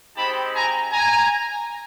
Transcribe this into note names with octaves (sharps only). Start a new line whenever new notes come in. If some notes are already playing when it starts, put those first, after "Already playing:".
G#3 C4 D#4 G4 A5 B5
G#5 A#5
G#5 A#5